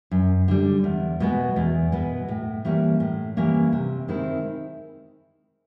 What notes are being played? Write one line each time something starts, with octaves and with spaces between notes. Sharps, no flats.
F#2
D3 G3
E2
B2 G#3 B3
E2
B2 G#3 B3
A2
E3 G3 A#3 C#4
A2
E3 G3 A#3 C#4
C3
D#3 G#3 C4 E4